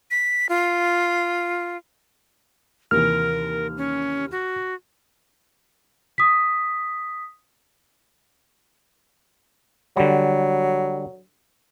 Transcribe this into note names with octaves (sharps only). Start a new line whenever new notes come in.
B6
F4
D#2 C3 E3 A#4 F6
C#4
F#4
D#6 B6
D3 F#3 G3